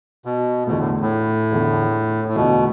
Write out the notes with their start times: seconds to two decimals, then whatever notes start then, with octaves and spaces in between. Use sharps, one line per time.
0.25 B2
0.67 E2 B2 D3 F3 A3
0.79 A2
1.01 A2
1.52 E2 D3 F3 A3
2.28 A2
2.35 E2 B2 D3 F3 A3